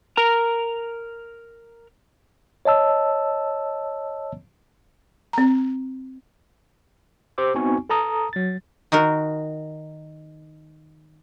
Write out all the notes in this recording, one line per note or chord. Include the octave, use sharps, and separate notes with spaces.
A#4 A#5
C#5 D#5 A5 E6
C4 A#5
G4 C5 D6 E6
B3 C4 D#4 F#4 G#5 C#6
A4 A5 A#5 D#6
F#3 A6
D#3 D#4 F#4 A#4